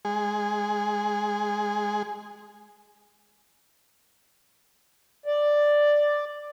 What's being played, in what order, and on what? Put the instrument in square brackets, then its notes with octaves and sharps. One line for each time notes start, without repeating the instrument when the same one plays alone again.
[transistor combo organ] G#3 G#4
[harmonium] D5